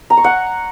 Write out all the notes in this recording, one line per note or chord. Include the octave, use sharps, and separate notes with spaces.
A#5
C#6
F#5